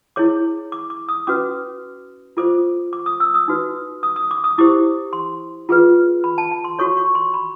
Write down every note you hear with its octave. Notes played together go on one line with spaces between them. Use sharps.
E4 G#4 C#5 D6
D6
D6
D#6
C#4 F#4 B4 D6
F4 A4 C5 D6
D6
D#6
E6
D#6
D#4 F#4 B4
D#6
D#6
D6
D#6
E4 G4 C5 D6
C6
F4 G#4 B4
B5
A5
A5
C6
F#4 A4 C#5 C#6
C#6
C6
B5